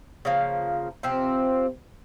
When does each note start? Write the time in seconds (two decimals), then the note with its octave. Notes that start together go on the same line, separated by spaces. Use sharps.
0.25 C#3 F3 A#3
1.03 C3 F3 C4